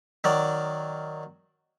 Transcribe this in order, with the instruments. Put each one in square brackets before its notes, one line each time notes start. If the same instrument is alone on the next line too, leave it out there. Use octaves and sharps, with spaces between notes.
[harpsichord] D#3 F#3 D5